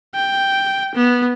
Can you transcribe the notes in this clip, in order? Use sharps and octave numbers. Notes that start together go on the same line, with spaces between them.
G5
B3